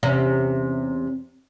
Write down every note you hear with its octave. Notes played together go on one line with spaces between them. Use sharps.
E2 C3 C#4